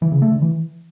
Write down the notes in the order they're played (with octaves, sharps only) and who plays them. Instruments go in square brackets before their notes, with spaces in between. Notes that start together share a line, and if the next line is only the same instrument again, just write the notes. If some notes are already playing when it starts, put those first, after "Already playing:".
[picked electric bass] E3
C#3
A3
D3
E3